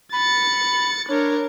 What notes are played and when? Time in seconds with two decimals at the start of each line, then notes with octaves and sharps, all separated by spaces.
0.13 B5 A6 C#7
1.09 D4 A#4 C#5